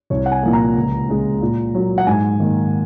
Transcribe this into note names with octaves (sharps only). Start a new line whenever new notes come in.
C2 C#5
F#5
G#5
A#2 F3 A#3
A#5
C#2
C#3 G#3
A#2
F#3 A#3
F#5
G#2 G#5
D#3 A#3